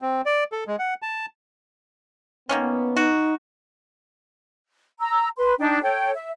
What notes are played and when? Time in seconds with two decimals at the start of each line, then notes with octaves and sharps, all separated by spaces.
0.02 C4
0.26 D5
0.52 A4
0.67 G#3
0.79 F#5
1.02 A5
2.49 D#3 A#3 B3 C#4
2.97 D#4 F#4
4.99 A#5 E6
5.36 B4 C6
5.59 D4 D#4 G5
5.82 A4 C#5 G5
6.15 E5